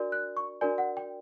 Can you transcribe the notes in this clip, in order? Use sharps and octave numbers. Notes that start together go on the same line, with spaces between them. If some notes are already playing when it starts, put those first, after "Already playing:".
Already playing: D4 F#4 A#4 D5
F#6
C#6
D4 F#4 A#4 D5 G#5
F#5
G5